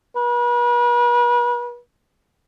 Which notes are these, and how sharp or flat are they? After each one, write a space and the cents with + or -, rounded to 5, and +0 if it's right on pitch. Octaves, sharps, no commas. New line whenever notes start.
B4 -40